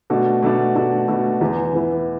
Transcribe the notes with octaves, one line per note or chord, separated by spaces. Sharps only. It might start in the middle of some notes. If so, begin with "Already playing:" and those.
B2 A3 D4 F#4
B2 A3 D4 F#4
B2 A3 D4 F#4
B2 A3 D4 F#4
E2 E3 B3 E4
E2 E3 B3 E4